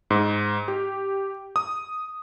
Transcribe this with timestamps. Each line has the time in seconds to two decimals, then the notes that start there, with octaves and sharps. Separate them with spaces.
0.10 G#2
0.68 G4
1.56 D#6